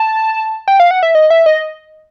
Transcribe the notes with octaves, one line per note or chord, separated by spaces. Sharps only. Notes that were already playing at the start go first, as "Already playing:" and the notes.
Already playing: A5
G5
F5
F#5
E5
D#5
E5
D#5